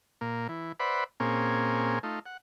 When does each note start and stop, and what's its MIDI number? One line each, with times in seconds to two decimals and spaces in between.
0.21 0.47 46
0.21 0.47 58
0.49 0.72 52
0.80 1.04 71
0.80 1.04 72
0.80 1.04 74
0.80 1.04 76
0.80 1.04 78
0.80 1.04 83
1.20 1.99 46
1.20 1.99 58
1.20 1.99 60
1.20 1.99 61
1.20 1.99 68
2.03 2.19 57
2.03 2.19 63
2.03 2.19 65
2.26 2.37 78